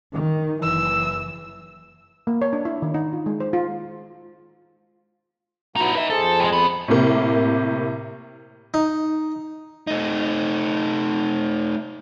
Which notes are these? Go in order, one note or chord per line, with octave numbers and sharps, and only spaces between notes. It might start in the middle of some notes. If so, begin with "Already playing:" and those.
D#3
F#1 E3 E6
A#3
C#5
D4
E4
D#3
D#4
F4
G#3
C5
F4
F#3 B3 D#4 E4 F#4
D#4 B4 E5
F2 G#4 A4 C5
G3 G#3
B3
A2 C3 A#3
D#4
A3 D#4